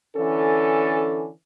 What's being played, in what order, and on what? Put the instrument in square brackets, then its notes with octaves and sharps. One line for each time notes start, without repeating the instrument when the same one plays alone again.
[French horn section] D3 E3 C#4 A4